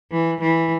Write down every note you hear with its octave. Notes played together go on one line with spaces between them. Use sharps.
E3
E3